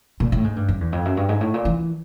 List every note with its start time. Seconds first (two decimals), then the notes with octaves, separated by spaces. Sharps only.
0.20 A#2
0.32 A2
0.44 G#2
0.56 G2
0.68 F#2
0.81 E2
0.92 F2
1.05 F#2
1.17 G2
1.29 G#2
1.41 A2
1.54 A#2
1.65 E3